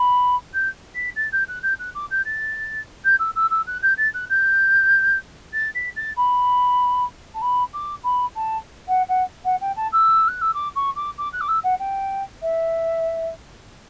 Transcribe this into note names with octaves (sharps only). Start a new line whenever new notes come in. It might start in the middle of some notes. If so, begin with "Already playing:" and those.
Already playing: B5
G6
B6
A6
G6
F#6
G6
F#6
D6
G6
A6
G6
E6
E6
E6
F#6
G6
A6
F#6
G6
A6
B6
A6
B5
A5
B5
D6
B5
A5
F#5
F#5
F#5
G5
A5
E6
F#6
E6
D6
C#6
D6
D6
F#6
D6
E6
F#5
G5
E5